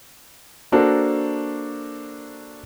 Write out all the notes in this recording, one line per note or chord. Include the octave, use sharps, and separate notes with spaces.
A#3 D4 F#4 A4 A#4 C5